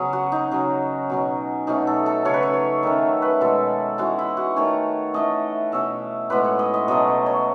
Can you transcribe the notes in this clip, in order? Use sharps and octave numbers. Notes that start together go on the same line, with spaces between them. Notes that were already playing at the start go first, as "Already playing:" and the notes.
Already playing: C#3 F#3 B3 C#4 G#4
F#4
D#4
C#3 F#3 C#4
B2 F#3 C#4
B2 A3 C#4 D#4
A4
A4
C#3 F#3 C#4 C#5
B4
C#5
C#5
D#3 A3 C#4 E5
B4
B2 G#3 B3 A4
E3 G#3 C#4 F#4
E4
F#4
D#3 A3 C#4 C#5
E3 A3 C#4 D#5
B2 A3 C#4 E5
A2 G#3 B3 B4
C#5
D#5
D#5
B2 F#3 A3 C#4 D#5
C#5
C#5